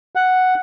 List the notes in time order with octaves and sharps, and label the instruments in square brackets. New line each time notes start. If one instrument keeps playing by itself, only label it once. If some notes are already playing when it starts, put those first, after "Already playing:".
[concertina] F#5